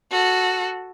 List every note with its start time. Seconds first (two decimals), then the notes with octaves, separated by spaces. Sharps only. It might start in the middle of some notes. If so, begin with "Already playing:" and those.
0.11 F#4 A4